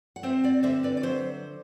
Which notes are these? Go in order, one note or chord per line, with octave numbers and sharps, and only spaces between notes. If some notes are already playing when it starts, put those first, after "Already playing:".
F#5
C4 C5 E5
D5 F#5
D3 C5 E5
B4 D5
D5
F#3 C5 E5